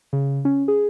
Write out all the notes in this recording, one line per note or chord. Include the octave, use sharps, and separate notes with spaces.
C#3
C#4
G#4